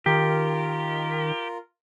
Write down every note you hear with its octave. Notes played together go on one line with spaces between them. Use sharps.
D#3 F4 G4 A#4